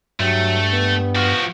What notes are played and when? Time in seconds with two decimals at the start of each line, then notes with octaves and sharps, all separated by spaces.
0.20 G2 F#3 A3
0.74 B3
1.15 F3 F#4